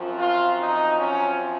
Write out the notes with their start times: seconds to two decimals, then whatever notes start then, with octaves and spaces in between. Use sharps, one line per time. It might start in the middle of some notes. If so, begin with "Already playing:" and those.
Already playing: F#2 F3 C4
0.16 F4
0.57 D#4
0.98 C#4